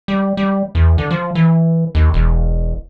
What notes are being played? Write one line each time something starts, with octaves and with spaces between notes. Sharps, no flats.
G3
G3
E2
D3
F3
E3
D#2
E1